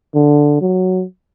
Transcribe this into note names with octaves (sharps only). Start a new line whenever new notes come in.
D3
F#3